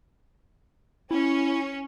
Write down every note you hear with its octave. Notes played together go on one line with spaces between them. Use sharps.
C#4 E4